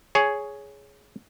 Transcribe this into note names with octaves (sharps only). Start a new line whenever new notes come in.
G#4 C#5